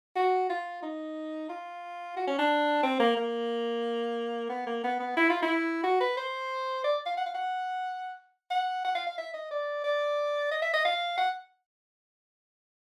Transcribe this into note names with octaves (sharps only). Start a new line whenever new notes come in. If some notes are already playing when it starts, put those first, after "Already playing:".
F#4
F4
D#4
F4
F#4
C#4
D4
C4
A#3
A#3
B3
A#3
B3
B3
E4
F4
E4
F#4
B4
C5
D5
F5
F#5
F5
F#5
F#5
F#5
F5
F5
E5
D#5
D5
D5
D#5
E5
D#5
F5
F#5